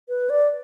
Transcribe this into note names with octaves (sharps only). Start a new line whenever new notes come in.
B4
D5